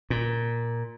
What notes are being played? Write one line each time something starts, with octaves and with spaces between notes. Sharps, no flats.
A#2